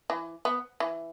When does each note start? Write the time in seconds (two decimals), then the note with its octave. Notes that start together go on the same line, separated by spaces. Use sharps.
0.10 E3
0.45 B3
0.80 E3